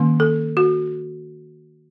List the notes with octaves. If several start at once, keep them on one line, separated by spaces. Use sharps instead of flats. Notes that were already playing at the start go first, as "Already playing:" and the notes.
Already playing: D#3 A#3 C#4
A4
F#4